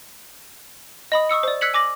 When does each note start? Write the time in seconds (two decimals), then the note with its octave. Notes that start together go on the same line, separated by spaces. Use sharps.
1.12 D#5 B5 D#6
1.29 C#6 D#6 E6 C#7
1.43 C5 D5
1.61 E6 F#6 G#6 B6 C#7 F#7
1.74 G#5 D6 A#6 F#7